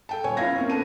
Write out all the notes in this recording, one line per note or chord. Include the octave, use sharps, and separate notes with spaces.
A4 G5 A5
D#1 C#5 G#5
C#2 E4 F4 F5 G#6 A#6
A#3 C4 C#4
D3 B3 A5 D#7